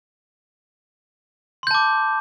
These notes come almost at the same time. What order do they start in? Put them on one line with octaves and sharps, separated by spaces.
C6 G6 A5 D6